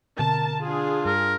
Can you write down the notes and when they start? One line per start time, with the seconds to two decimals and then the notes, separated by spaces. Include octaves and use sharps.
0.19 B2 D3 C4 A#4 A5
0.63 D4 F4 G#4
1.05 G2 A#4